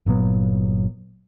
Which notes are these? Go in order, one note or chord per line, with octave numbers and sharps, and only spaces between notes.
G1 A#2 F#3 B3